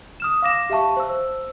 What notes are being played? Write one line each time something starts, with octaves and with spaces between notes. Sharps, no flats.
D#6 F6 E7
F5 D6 A#6 E7
G4 E5 F5 A5 C#6
C5 E6